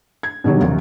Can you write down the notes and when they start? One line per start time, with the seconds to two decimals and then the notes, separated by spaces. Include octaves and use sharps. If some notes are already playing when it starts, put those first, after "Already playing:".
0.23 G#6
0.44 B2 D3 D#3 F#3 G3
0.60 A#1 D#2 C3 D#3